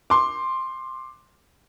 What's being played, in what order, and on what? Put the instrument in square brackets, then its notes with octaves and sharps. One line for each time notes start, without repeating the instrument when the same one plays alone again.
[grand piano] C6 D6